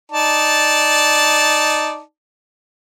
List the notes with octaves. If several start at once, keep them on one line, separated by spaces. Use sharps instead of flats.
D#4 D5 A5